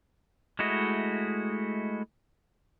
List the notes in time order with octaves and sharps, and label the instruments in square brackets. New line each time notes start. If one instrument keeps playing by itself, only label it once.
[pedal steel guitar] G#3 A3 E4 F#4 D#5